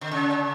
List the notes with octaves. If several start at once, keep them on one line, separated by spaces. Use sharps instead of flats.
D3
C#3